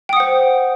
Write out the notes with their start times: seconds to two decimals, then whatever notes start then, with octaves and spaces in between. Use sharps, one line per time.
0.09 G5
0.13 D#6
0.16 F#5
0.20 C5